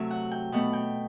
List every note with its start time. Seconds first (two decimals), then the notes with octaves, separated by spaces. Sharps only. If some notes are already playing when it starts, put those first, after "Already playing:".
Already playing: C3 F#3 A3 E5
0.11 F#5
0.31 G5
0.52 B2 A3 F#5
0.73 G5